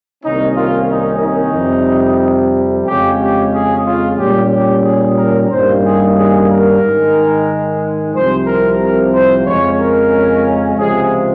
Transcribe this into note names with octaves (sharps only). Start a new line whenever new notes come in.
C2 C3 D#3 A#3 C#4 D#4
F4
D#4
D#4
F2 C3 G3
F2 C#3 G#3 C#4 G4
G4
G#4
F4
A#2 G3 C#4 G4
G4
G#4
A#4
G2 D#3 G3 A#3 C#4 C5
G#4
G#4
A#4
G#2 D#3 G#3
C2 C3 F3 C5
A#4
A#4
C5
F2 C#3 G#3 C#4 C#5
A#4
C#2 C3 F3 G#3 G#4